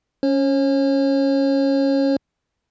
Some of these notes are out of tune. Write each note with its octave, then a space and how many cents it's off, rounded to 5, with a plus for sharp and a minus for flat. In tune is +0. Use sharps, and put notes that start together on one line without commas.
C#4 +0 C#5 -40